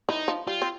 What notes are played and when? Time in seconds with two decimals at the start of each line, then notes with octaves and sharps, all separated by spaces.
0.09 E3 D#4
0.28 F3
0.47 G3 F4
0.62 C4